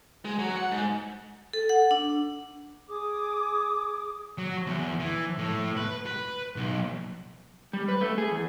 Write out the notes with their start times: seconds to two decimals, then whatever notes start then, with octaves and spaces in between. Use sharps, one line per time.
0.25 G#3
0.39 F#3
0.56 F#5
0.72 G#2
1.53 A4
1.69 F#5
1.91 D4
2.87 G#4 D6 D#6
4.38 F#3
4.67 E2
5.00 E3
5.38 A2
5.77 B4
6.06 B4
6.56 B1
7.73 G3
7.88 B4
8.01 A3
8.18 G#4
8.31 E2